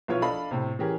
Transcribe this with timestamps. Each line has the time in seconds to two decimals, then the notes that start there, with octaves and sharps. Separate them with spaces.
0.08 B1 F3 E4 F4 B4 C#5
0.22 D4 A4 D5 D#5 F5 B5
0.51 A2 C3
0.79 E3 C#4 G4 G#4 A#4